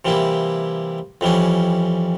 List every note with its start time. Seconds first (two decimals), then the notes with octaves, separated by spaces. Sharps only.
0.05 C3 E3 G3 A#3 E4
1.21 F2 E3 G3 C#4